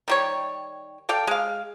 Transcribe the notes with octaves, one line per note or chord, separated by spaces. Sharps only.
D#3 G3 C#5
A4 D5 F5 G5
G#3 F5